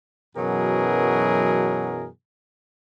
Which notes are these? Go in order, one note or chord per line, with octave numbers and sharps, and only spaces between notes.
F#2 B2 E3 F#3 G#4 A#4